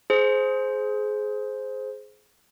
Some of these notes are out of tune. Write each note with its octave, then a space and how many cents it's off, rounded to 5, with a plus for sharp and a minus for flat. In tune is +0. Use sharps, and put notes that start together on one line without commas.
G#4 +20 C5 +0